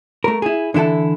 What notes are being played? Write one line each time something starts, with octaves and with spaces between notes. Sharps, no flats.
A3 A#4
E4 G#4
D3 E3 E4 A4 A5